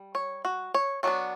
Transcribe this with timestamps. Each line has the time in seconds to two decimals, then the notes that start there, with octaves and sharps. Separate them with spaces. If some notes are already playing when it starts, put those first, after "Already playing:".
Already playing: G3
0.15 C#5
0.45 F#4
0.74 C#5
1.03 F#3 B3 D4 C#5